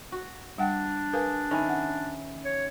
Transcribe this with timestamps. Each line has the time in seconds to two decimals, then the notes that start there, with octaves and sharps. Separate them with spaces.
0.12 F#4
0.58 G3 D4 F#5 G5
1.13 G#4 A#4 B4 F5
1.51 D#3 C#4 E4
1.69 F#5
2.45 C#5